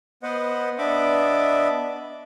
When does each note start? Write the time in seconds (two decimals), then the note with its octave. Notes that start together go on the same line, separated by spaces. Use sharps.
0.23 B3 B4 C5 D#5 F#5
0.78 B3 D4 D#5 E5 B5 D6